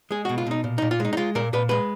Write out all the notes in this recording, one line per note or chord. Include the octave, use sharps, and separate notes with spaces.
G#3 G#4
B2 F#4
F4
B2 D#4
A#2
A#2 D#4
F4
G#3 D#4
D#4
G#3 F4
A#2 A#4
A#2 B4
G#3 B4